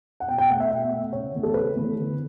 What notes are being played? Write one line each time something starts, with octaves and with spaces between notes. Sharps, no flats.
F#5
B2 G5
G5
A3 F#5
E5
B2 E5
A3
C#3 C#5
E3 A3
A4
C#3 B4
E3 A3
D3